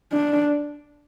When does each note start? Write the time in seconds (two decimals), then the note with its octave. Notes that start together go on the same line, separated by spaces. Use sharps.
0.13 D4